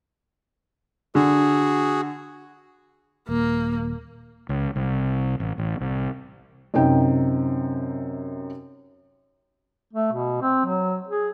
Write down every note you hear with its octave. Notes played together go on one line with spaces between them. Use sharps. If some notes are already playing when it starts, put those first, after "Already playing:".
D3 F#4 G#4
D#1 A#3
C#2
C2
A1
A1
C2
F#2 C3 D#4 G5
A3
B2
C4
F#3
G#4